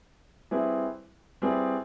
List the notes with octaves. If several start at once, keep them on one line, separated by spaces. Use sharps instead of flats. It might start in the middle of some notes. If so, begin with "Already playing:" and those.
G3 C4 E4 G#4 B4
G3 C4 E4 G#4 B4